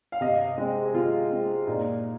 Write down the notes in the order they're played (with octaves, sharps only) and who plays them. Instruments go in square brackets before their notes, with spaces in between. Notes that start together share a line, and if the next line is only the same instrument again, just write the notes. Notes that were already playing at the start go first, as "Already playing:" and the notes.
[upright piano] F5
C3 D#5
G#3 C4
G#4
C3 F4
G#3 C4
A#2 D#4